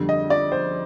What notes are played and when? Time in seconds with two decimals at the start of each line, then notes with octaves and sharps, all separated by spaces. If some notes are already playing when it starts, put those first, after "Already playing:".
Already playing: F2 D3 G3
0.09 D#5
0.30 D5
0.52 C5